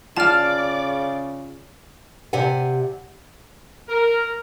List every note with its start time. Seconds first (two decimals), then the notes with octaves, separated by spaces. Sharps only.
0.17 C#3 F4 D5 F5 A5 D6 F6 A6
2.33 C3 G4 D5 F#5 G#5
3.89 A#4